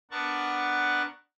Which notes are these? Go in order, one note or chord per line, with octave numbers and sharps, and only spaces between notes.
B3 D4 A#4 F#5 A5 C#6